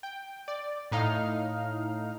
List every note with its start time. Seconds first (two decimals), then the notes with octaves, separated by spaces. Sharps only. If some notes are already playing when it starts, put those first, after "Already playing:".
0.03 G5
0.48 D5
0.92 A2 D#4 F5 F6